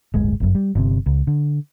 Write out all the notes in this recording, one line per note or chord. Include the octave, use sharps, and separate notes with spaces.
D1 G1 G#3
G1 F#2
G3
G1 C3
C#2
D3